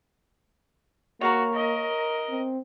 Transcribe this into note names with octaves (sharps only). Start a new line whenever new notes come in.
A#3 F#4 C#5 F5 A#5
A#4 D#5
C4